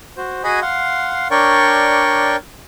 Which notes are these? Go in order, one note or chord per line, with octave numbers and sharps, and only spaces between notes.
F#4 C5
F#4 G#4 D#5 F#5 G#5 B5
F5 F#5 C6
D4 A#4 C#5 D5 G5 C#6